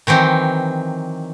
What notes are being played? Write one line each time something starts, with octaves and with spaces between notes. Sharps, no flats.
D#3 E3 F#3 C4